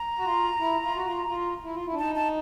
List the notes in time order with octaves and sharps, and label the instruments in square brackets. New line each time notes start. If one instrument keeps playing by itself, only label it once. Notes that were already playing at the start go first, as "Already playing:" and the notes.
Already playing: [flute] A#5
[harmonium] F#4
F4
E4
F4
F#4
F4
F4
E4
F4
E4
D4
[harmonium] D#4 [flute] A5
[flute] A5